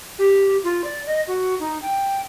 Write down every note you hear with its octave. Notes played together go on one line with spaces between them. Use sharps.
G4
F4
D5
D#5
F#4
D#4
G5